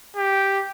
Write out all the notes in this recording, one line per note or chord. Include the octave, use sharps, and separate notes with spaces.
G4